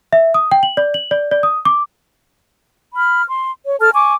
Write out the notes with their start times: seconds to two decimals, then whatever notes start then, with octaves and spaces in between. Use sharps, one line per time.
0.13 E5
0.34 D#6
0.52 G5
0.63 F#7
0.77 D5
0.94 F#7
1.11 D5
1.31 D5
1.43 D#6
1.65 D6
2.94 B5 F6
3.28 C6
3.65 C#5
3.80 A4 A5 F6
3.93 G#5 C#6 D6